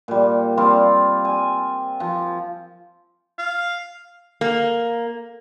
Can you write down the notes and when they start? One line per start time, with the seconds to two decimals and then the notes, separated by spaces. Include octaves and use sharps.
0.08 A#2 G3
0.57 G3 C4 F4 D5
1.25 G#5
2.00 F3
3.38 F5
4.41 A#3